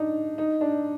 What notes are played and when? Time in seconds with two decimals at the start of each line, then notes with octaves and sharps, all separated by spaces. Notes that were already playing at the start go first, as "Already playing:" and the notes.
Already playing: D4 D#4
0.38 D#4
0.61 D4